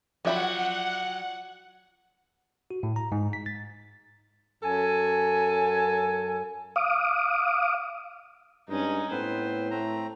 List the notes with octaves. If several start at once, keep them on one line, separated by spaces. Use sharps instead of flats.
F3 F#3 F4 D5 E5 F#5 G5 B5
F#4
A2
A#5
G#2
B6
A6
F#2 C#4 A4 G#5
F5 D6 D#6
G2 G#3 C#4 D#4
A2 B3 C4 B4 C5
A3 C4 A#5